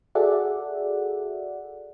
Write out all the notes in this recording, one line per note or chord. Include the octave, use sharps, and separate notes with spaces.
F#4 G#4 A4 D5 E5 F#5